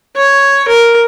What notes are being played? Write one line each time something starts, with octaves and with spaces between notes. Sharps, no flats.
C#5
A#4